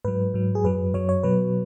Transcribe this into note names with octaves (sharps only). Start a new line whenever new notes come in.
G#2 F#3 B4
G#2 F#3
G#4
F#2 F#3 B4
F#2 F#3 C#5
C#5
B2 F#3 B4